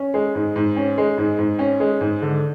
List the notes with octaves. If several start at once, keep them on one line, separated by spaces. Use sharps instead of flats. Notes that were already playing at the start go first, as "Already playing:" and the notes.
Already playing: C#4
G#3
G#2
G#2
C#4
G#3
G#2
G#2
C#4
G#3
G#2
D3